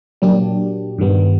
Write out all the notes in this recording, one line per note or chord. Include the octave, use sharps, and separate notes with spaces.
A#2 F#3 A#3 D4 G4
G2 D#3 G3 B3